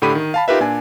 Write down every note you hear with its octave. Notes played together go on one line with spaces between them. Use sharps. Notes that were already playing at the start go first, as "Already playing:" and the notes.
A2 D3 G4 B5 D#7
D#3
F5 A5 B5
D#4 F4 G4 A#4 B4 E5
A#2 D4 G#5